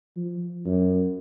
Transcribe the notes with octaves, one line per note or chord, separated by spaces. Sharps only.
F3
F#2